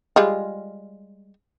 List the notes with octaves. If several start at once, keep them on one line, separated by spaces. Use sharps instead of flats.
G3 G#3 F4